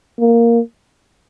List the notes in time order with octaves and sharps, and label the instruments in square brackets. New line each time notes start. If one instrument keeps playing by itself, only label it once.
[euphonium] A#3